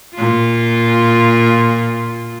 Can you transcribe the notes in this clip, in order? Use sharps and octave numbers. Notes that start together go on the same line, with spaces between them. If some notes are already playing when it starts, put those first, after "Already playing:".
A#2 F4